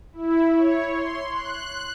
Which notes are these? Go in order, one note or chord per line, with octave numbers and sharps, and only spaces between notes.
E4
C#5
C6
F#6